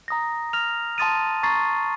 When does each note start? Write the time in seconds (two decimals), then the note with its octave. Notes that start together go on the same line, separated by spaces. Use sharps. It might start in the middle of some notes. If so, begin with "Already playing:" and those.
0.08 A#5 D#6 A#6
0.53 F6 A#6 F7
0.98 A5 C6 D#6 A6 D#7
1.43 A#5 C#6 A6 C7